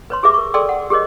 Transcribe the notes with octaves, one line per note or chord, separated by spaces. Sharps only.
B4 C#5 C6
G4 G#4 B4 E5 D6
A#4 C#6
G#4 A4 D5 G5 C6 E6
F#5
G4 G#4 A#4 C#5 D#5